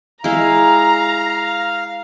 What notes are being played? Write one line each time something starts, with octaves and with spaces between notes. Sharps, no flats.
G#3 E4 F5 A#5